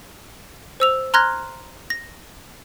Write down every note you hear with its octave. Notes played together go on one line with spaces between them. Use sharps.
C5 E6 F7
A#5 C6 F6 F#6 G#6 A#6
A#6